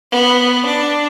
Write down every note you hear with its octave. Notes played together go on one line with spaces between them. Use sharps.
B3
D4